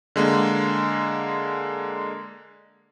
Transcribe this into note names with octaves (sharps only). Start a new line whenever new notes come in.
D3 G#3 A#3